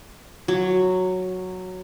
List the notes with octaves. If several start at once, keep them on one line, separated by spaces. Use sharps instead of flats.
F#3